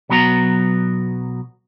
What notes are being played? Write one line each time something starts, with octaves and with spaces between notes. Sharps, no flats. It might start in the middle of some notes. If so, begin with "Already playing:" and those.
B1 F#3 B3 F#4 A#5